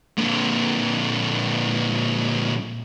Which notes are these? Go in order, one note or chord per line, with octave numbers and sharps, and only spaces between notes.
A#2 D3